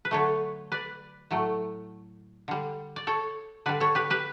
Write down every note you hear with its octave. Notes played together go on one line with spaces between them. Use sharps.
B4
D3 F#3 A3 A4 C#5
B4 D5
A2 F#3 A3
D3 G3
D5
A4 C#5
D3 G3 B4 D5
A4 C#5
G4 B4
G4 B4